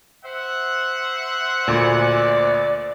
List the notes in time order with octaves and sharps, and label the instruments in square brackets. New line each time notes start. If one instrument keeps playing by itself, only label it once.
[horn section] C5 E5 F#5
[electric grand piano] D2 A#2 [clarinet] D5